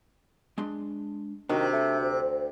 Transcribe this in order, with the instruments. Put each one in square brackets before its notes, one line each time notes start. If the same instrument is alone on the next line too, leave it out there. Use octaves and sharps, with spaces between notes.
[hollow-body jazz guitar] G#3 D4 C6
[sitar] C3 [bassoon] D#3 [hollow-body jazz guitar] D4 F#4
[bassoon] A3
D2